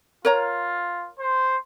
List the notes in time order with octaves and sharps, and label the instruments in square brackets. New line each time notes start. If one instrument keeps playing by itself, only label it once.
[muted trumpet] F4 [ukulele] A#4 C#5 A#5
[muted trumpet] C5